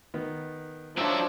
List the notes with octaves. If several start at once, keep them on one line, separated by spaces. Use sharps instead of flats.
D#3 B3
F3 F#3 D4 C#5 E5 D7